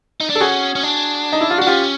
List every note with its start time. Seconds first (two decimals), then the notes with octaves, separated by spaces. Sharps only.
0.20 D#4
0.30 D4
0.35 A4
0.41 C#4 F#4 G#4
0.75 C#4
0.83 D4
1.33 D#4
1.41 E4
1.50 F4
1.58 D4 F#4
1.67 C#4 F4 G4